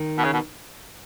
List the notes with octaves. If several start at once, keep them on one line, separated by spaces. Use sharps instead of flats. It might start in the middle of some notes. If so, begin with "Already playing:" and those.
Already playing: D#3
B2
C#3
B2